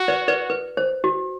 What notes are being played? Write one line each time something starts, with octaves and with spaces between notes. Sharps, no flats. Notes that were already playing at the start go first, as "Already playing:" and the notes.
Already playing: F#4
B4 D5
B4 D5
B4
C5
F#4